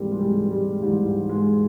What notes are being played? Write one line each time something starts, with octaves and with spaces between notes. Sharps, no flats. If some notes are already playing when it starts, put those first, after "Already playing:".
Already playing: G#2 E3 G3 A#3 C4
G#3
G3
G3
G#2 E3 G3
G#3